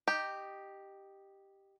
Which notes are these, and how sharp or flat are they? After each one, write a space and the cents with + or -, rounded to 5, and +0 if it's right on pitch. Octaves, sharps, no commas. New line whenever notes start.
D#4 -10 G4 +0